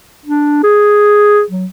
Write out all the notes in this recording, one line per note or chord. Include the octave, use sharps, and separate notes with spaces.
D4
G#4
F#3